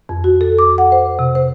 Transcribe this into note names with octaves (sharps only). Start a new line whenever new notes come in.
F2
F#4
A4
D6
F#5
C5
C3
C5